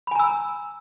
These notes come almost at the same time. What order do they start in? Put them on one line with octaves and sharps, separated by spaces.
B5 G#5 A#5 E6